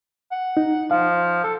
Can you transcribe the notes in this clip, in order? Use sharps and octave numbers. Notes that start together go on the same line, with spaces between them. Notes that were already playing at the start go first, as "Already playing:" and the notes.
F#5
D#4
F3 F5
A4